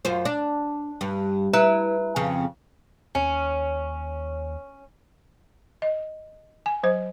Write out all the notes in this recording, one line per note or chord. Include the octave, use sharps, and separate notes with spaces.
F#2 F4 C5
D4
G2
E4 B4 A#5 F#6
F2 C#3
D#2 C#4
D#5
G#5
F#3 C5